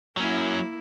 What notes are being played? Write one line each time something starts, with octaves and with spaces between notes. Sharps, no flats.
F#3 A#3 C#4 E4